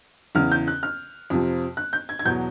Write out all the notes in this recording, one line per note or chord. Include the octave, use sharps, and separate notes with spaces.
E2 C#3 E3 F6
G6
F#6
F6
F2 C3 F3
F#6
G6
G#6
G#6
E2 B2 F#3 G6